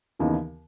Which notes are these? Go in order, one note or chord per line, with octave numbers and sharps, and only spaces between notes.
D#2 C#3 E3 B3 D#4